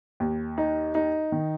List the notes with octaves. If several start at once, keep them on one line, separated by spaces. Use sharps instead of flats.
D#2
D#4
D#4
D#3